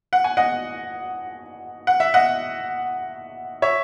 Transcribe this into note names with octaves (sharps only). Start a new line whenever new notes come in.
F#5
G#5
D#5 F#5
F#5
E5
D#5 F#5
C#5 E5